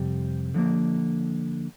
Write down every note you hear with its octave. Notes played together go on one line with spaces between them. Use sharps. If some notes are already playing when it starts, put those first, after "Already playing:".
Already playing: F2 C3 G3 G4
D3 F3 A#3